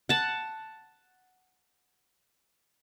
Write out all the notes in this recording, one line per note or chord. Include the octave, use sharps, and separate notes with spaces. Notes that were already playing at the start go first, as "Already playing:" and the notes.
F#5 A5